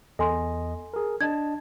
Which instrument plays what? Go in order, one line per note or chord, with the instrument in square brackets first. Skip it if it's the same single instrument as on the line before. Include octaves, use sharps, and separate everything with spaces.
[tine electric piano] E2 D#5 [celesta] A4 G#5 C6
[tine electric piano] G#4 A#4
[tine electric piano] D4 D#5 A5 [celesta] G#6